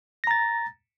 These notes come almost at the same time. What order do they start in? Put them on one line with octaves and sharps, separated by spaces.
A#6 A#5 A6